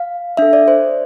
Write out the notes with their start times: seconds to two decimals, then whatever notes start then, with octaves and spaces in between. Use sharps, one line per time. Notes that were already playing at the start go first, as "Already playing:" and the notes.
Already playing: F5
0.37 D4 A4 E5
0.53 D5
0.68 C5